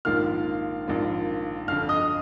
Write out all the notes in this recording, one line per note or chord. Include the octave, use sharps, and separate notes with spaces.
A#1 G#2 D#3 A#3 F4 F5 F6
A#1 G#2 D#3 A#3 F4
G1 F2 D3 F5 F6
D#5 D#6